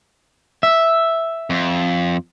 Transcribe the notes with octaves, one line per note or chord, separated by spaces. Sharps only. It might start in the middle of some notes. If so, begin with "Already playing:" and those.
E5
F2